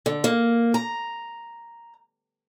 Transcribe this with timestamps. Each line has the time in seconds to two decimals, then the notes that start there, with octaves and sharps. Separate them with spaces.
0.06 D3
0.24 A#3
0.74 A#5